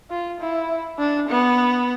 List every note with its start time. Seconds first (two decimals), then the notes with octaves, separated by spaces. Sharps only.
0.10 F4
0.40 E4
0.99 D4
1.29 B3